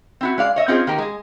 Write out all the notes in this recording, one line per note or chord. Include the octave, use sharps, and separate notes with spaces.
C4 E4 F#4
G#3 D5 F5
C#5 D#5 E5
C4 C#4 D#4 F4 G#4 C5
D#3 A#3 G4 A#4
G#3 G#4